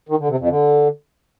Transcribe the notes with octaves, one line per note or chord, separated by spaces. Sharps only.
D#3
D3
C3
F2
D3